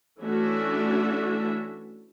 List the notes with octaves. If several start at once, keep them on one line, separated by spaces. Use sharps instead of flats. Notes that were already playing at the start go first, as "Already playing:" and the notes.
E3 A3 C#4 D4 F#4 E5